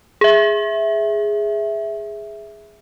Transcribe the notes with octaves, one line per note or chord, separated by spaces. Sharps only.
G#4 E5